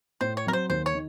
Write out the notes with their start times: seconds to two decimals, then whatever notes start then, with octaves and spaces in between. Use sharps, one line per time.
0.21 A2 C5
0.37 C#5
0.45 F#3 C4 A#4
0.53 C5
0.70 D#2 C5
0.86 C#5
0.94 D#3